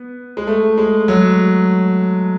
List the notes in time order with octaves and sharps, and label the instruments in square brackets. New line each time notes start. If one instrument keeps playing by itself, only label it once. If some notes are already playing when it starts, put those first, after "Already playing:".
Already playing: [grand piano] B3
G#3
A3
G#3
F#3